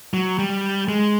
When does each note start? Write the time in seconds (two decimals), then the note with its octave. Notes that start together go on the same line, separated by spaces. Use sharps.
0.14 F#3
0.39 G3
0.89 G#3